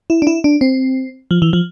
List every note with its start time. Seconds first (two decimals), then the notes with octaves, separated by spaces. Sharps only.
0.10 E4
0.22 D4
0.27 E4
0.44 D4
0.61 C4
1.31 F3
1.42 E3
1.53 F3